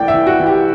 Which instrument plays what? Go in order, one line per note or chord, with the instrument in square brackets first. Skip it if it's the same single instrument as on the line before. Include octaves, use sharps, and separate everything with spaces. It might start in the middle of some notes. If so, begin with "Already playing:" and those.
Already playing: [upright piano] C2 E3 A3 D5 G5
E5
E3
F#4
E3
G4